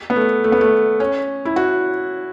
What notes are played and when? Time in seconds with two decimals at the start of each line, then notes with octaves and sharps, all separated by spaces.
0.10 B3
0.16 A3
0.44 A3
0.52 B3
0.61 A3
1.00 C#4
1.45 E4
1.56 F#4